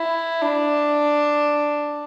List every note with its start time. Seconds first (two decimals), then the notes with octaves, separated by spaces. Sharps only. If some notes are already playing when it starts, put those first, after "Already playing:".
Already playing: E4
0.42 D4